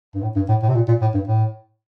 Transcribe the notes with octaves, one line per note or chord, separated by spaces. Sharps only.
G2
A2
G2
A2
A2
C3
A#2
A#2
A2
G2
A2